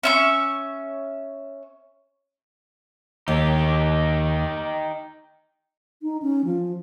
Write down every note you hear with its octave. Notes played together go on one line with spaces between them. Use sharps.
C#4 E5 C#6
D#2 D#4 G4
D#4
C#4
F3